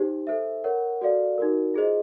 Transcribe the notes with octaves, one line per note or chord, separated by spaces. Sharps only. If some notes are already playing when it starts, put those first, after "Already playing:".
Already playing: D#4 G4 C5
A4 C5 E5
A#4 C#5 F#5
F#4 A4 D5 F5
D#4 F#4 A#4
F4 G#4 C5 D#5